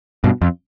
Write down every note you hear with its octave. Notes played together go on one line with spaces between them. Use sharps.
G2 B2
F2